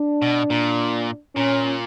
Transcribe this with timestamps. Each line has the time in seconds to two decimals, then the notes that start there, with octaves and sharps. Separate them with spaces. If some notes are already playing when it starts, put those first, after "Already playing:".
Already playing: D4
0.22 B2
0.50 A#2
1.35 A#2 C#4